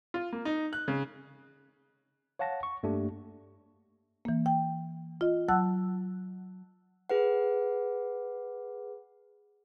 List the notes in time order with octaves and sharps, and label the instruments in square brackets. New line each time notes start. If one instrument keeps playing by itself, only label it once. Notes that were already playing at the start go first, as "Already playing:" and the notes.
[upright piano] F4
A#3
D#4
F#6
C#3
[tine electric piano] C#5 F5 F#5 A5 A#6
C#6
G2 A3 A#3 D4 G4
[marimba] E3 A#3
G5
F4 D#5
F#3 F#5 A5 E6 F#6
[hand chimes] G#4 B4 F#5